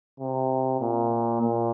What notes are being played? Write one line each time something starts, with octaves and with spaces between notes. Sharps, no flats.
C3
A#2
A#2